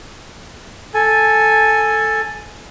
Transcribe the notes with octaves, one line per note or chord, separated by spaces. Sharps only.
A4 G#5